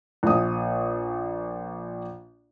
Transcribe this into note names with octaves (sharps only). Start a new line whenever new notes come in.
A#1 D#6